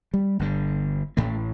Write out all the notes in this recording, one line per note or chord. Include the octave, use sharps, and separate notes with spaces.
G3
G1 G2 D3
A1 A2 A3